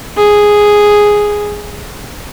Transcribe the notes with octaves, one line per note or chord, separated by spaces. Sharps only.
G#4